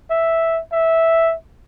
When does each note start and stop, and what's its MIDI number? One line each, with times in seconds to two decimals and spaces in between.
0.10 0.60 76
0.72 1.34 76